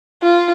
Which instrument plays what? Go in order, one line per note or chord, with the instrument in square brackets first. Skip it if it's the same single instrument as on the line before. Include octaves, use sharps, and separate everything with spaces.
[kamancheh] F4